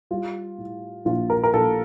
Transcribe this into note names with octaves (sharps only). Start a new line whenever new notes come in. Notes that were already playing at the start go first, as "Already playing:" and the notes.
G3 F4
A2
A#1 F4
A#4
A#4
A#1 A4